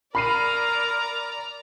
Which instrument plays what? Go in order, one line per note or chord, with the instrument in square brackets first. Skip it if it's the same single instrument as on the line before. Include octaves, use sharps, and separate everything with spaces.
[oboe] A#4 [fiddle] D5 A#5 [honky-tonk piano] B5 C7 D#7